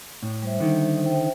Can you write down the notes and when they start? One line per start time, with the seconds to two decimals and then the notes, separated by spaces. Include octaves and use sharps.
0.23 A2
0.42 G3 C5 E5
0.60 D3 D#3
1.03 C5 E5 G5